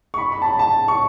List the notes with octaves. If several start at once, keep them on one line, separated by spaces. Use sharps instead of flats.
C#6
B5
B5
A5
B5
A5
C#6